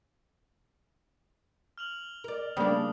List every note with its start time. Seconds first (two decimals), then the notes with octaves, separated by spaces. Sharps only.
1.78 F6 F7 F#7
2.24 A#4 D5
2.57 C#3 G3 A3 A#3 D4 A#4 D#6